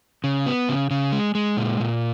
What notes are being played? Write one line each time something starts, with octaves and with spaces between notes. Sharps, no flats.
C#3
B3
C#3
C#3
G#3
G#3
A#2
A#2